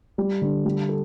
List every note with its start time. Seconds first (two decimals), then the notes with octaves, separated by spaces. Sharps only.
0.18 G3
0.42 D3
0.65 G3
0.89 A4